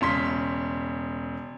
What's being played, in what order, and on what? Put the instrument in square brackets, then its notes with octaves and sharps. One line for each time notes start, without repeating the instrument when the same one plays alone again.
[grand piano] E1 C#3 C6 B6